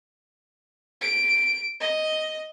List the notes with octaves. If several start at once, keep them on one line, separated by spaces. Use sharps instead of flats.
D7
D#5